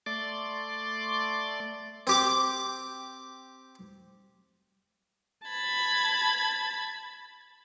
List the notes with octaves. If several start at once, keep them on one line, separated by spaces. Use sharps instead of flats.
A3 D5 C6 D6
C4 G4 D6
A5 B5 G#6